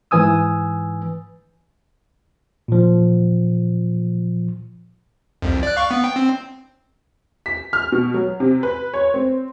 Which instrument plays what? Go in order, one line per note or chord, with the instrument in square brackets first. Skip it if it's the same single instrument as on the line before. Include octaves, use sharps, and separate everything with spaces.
[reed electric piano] G#2 E3 B4 G#5 D#6 E6
[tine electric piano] A#2 F3
[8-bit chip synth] C2 F2
D5 F#6
F5 C#6
B3
G5
C4
[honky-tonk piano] B6
F6
B2
F#3
C3
B4
C#5
C4